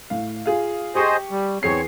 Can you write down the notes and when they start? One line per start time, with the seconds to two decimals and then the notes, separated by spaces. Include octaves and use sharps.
0.10 A2 F5
0.46 F4 G#4 F5
0.95 G4 G#4 C5 D#5 C#6
1.31 G3
1.63 E2 C4 G#4 C#5 C7